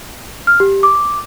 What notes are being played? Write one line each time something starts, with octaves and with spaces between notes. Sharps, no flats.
F6
G4
D6